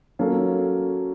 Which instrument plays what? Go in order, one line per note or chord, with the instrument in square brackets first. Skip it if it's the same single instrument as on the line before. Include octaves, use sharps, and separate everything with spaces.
[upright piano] F#3 A#3 C#4 F#4 A4